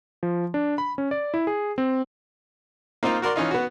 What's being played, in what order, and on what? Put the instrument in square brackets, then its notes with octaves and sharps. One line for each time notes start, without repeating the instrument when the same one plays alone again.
[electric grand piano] F3
D4
B5
C#4
D5
E4
G#4
C4
[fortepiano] A#3 C4 D#4 F4
F#4 A#4 D5 C6
E3 C#4 D#4 F4
B3 F#4